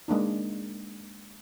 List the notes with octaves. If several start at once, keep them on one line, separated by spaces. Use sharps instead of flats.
G#3 A#3 D4 D#4